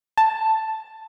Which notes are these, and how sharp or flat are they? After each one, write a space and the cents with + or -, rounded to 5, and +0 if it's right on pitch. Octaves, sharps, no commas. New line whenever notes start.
A5 +5